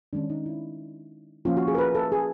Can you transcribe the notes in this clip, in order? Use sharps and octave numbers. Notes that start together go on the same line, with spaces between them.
D#3 G#3 C#4 D4
D#4
E4
F3 A#3 C#4 F4
F#4
G#4
A#4
B4
A4
G#4